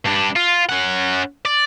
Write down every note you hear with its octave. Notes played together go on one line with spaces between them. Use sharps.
G2 D4
F4
C#4 F#5
D5